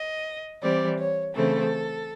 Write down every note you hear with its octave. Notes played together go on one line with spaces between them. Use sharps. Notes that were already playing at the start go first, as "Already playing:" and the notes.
Already playing: D#5
E3 G3 C4 D5
C#5
C#3 E3 A3 C4 A4